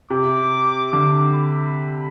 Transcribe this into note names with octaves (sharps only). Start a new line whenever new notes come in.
C3 D6
D3 D6
B5